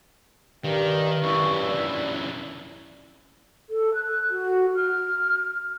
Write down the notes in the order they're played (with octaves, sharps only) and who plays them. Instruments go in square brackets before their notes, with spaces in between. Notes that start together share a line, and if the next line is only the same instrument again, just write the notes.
[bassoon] G2 [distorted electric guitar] D#3 [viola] G4 A#4 [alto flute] D5
[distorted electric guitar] F#2 E3 [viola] E4 [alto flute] C#6
[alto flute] D5
[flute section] A4
F#6
F#4
F6